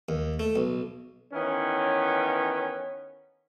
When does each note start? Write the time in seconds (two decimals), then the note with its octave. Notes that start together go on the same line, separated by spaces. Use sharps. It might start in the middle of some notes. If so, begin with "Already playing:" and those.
0.09 D#2
0.40 A3
0.56 B1
1.33 D#3 E3 B3 C#4